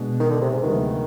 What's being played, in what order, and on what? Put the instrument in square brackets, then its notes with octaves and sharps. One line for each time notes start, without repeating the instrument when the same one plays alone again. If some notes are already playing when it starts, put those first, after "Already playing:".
Already playing: [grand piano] B2 G#3 D4
[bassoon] D#3
D3
C3
G#2
[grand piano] D2 C3 F3 G#3 B3 [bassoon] D#3